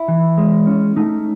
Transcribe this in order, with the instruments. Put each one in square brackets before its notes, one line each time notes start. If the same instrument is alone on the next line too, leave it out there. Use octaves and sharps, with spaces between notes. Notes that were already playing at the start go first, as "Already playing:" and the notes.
Already playing: [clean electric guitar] E4
E3
G#3
C#4
A3 D#4